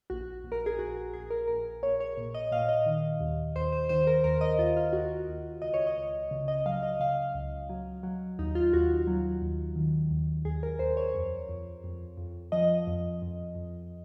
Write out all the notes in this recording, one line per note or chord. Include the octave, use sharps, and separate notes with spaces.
A#1 F#4
A#1
A#4
G#4
A#1 F#4
A#1 G#4
A#4
A#1 A#4
A#1 C#5
C#5
A#2
D#5
A#2 F5
D#5
D#3
D#2
D#2 C5
C5
D#3 C5
A#4
D#2 A#4
D#5
D#2 F4
F4
D#2 F#4
D#2
C#2 D#5
C#5
D#5
C#2
C#3
D#5
F#3 F5
D#5
C#3 F5
C#2
F#3
F#3
D#2 D#4
F4
D#2 F#4
F#3
D#2
D#3
D#2
D#2 G#4
A#4
D#2 C5
C#5
F2
F2
F2
F2
F3 D#5
F2
F2
F2